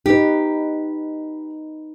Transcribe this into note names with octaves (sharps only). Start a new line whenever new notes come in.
D#4 G4 B4